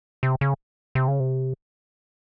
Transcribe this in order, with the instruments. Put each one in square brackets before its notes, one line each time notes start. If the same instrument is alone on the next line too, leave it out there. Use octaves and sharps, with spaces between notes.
[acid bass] C3
C#3
C3
C#3
C3